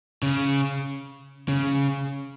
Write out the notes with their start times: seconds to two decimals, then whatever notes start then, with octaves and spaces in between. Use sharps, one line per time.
0.22 C#3
1.48 C#3